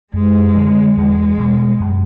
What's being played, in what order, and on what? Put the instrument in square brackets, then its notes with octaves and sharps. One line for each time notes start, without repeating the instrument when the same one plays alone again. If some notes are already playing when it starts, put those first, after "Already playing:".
[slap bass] F#2 [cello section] G#3
[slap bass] D3 F3 A3
[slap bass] E2 [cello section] G#3
[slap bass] B2 G3
F#2